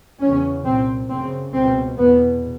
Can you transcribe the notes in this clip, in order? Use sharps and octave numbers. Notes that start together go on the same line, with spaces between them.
E2 C#3 C#4
C2 A#2 C4
F#2 C#3 C4
C#2 B2 C4
E2 B2 B3